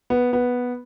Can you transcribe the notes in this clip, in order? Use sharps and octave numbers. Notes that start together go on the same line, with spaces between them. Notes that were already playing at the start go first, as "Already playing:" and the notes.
B3
B3